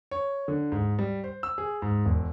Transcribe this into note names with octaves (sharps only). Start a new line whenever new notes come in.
C#5
D3
G#2
G3
C5
E6
G#4
G#2
E1